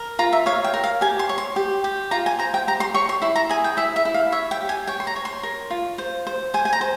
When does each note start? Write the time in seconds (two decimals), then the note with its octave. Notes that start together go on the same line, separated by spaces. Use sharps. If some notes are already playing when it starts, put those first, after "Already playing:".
Already playing: A#4
0.19 F4 A#5
0.32 E5
0.46 C#5 F5
0.64 G5
0.74 A#4
0.84 F5
1.01 G4 G#5
1.19 C6
1.29 C#5
1.38 C6
1.56 G4
1.84 G4
2.11 F4 A#5
2.26 G#5
2.39 C5 A#5
2.54 G5
2.68 G4 A#5
2.80 C6
2.94 C#5 C#6
3.09 C6
3.22 E4 C6
3.36 A#5
3.49 G#4 G#5
3.64 G5
3.77 E4 E5
3.96 E5
4.05 E4
4.14 F5
4.32 C#5 E5
4.51 G5
4.61 G4
4.69 G#5
4.88 C#5 G5
5.00 C6
5.07 A#5
5.16 C#5
5.25 C6
5.43 A#4
5.70 F4
5.98 C5
6.27 C5
6.54 C5 G#5
6.65 G#5
6.73 A#5
6.81 C5